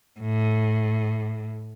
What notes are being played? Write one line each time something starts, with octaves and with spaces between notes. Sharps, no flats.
A2